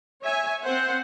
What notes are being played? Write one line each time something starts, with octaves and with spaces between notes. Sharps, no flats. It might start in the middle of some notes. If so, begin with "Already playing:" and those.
C#5 E5 G#5
C4 C5 F#5